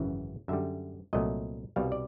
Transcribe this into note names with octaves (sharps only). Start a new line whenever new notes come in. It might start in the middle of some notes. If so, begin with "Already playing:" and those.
Already playing: G#1 F#2 C#3 E3
F#2 D3 G3 E5
C2 A#2 F#3 A3 D#5
C2 B2 G3 F5
D5